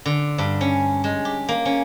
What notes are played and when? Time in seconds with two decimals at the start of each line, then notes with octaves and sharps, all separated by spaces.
0.06 D3
0.38 G2
0.61 C#4
1.04 G#3
1.25 G4
1.49 A#3
1.65 C#4